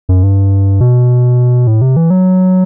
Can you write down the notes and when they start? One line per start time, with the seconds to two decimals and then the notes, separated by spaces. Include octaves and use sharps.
0.09 F#2
0.23 G2
0.80 B2
1.67 A2
1.82 C3
1.96 E3
2.10 F#3